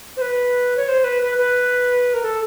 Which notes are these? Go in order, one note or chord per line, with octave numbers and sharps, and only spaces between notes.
C5
B4
C#5
C5
B4
B4
B4
A#4
A4